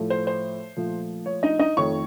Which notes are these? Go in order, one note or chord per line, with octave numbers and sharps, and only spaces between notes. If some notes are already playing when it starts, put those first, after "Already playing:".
Already playing: A2 F3 A3
C5
C5
A#2 F3 A3
C#5
D#4 D#5
D#4 D#5
F2 D#3 A3 C#5 C#6